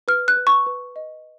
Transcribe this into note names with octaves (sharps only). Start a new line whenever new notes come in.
B4 F6
F#6
B4
C#6
B4
D#5